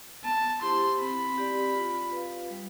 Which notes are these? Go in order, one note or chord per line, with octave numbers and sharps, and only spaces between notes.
B3 A5
E4 G4 C5 C6
C4 B5
G4 D5
F4
B4 F5
G3